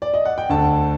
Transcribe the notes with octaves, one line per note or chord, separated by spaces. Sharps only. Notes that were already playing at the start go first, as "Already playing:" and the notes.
D5
D#5
F#5
G5
D2 D3 A5